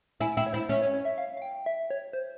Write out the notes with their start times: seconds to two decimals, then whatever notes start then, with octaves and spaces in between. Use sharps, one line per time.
0.21 E4 G#5
0.37 E4 G5
0.46 C#5
0.53 E4 C5
0.69 C#4 E5
0.82 C#5
0.94 C#5
1.05 E5
1.18 F5
1.37 F5
1.42 G5
1.66 E5
1.91 C#5
2.13 C5